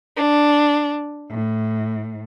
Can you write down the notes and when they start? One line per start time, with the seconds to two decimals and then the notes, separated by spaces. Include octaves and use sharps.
0.17 D4
1.30 A2